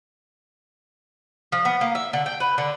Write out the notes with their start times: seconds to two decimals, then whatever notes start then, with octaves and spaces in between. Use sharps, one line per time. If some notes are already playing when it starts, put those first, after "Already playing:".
1.52 F3
1.65 B3
1.81 A#3
1.95 E5
2.13 D3
2.26 G5
2.40 B4
2.58 D3